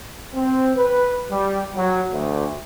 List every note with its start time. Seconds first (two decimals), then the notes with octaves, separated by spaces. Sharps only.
0.35 C4
0.76 B4
1.31 G3
1.76 F#3
2.12 D2